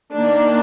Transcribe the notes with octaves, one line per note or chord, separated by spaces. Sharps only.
D#3 A#3 D4